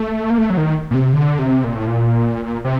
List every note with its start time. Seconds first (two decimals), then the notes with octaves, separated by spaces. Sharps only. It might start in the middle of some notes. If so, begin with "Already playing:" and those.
Already playing: A3
0.30 A#3
0.38 A3
0.50 F#3
0.57 D#3
0.91 A#2
0.94 C3
1.13 D3
1.39 C3
1.64 A#2
1.75 A2
1.87 A#2
2.64 C3